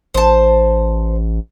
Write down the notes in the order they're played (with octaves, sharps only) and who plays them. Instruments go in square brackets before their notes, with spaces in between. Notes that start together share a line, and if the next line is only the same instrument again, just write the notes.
[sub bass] A1 [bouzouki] C5 A5